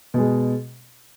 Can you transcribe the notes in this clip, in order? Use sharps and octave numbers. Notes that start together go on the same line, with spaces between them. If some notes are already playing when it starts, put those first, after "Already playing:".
B2 G#3